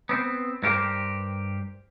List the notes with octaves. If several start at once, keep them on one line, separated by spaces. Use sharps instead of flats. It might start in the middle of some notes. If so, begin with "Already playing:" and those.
B3 C4
G2 A#3 G4 A#4 C5